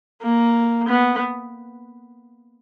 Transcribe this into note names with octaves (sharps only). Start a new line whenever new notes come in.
A#3
B3